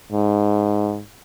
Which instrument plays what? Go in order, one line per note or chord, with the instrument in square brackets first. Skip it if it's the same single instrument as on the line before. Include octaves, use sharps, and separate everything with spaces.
[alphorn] G#2